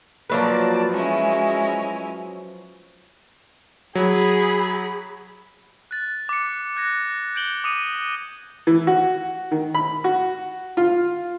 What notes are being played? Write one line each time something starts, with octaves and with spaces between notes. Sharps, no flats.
F3 F#3 A#3 B4 D5 A5
G#3 C#4 E4
F#3 G#4 B5
F#6 A6
D6 C#7
F#6 G#6 A#6
G6 D7 F#7 G7
D6 D#6 C#7 D#7
E3
F#4
D#3
B5
F#4
F4